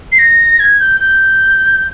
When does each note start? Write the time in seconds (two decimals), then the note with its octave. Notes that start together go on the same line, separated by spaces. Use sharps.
0.12 C7
0.19 A#6
0.60 G#6
0.80 G6
1.00 G6